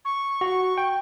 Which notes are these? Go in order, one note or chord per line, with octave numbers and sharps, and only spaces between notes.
C#6
F#4
G5